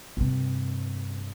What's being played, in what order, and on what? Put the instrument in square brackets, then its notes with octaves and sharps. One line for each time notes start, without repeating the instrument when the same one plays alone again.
[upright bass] G2 C3